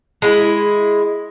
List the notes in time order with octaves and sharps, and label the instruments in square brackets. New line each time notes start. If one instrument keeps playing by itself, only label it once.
[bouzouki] G#3 E4